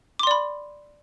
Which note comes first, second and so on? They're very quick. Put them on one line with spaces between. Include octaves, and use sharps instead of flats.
D6 C6 D5 B5